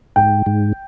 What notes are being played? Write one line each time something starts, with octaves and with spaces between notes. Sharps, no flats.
G#2 G5
G#2